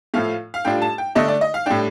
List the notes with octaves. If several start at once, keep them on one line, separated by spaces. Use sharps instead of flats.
A2 F3 A3 F5
F5
A2 G3 D4 F4 G5
A5
G5
D3 A3 D4 D#5
D5
D#5
F5
A2 G3 D4 G5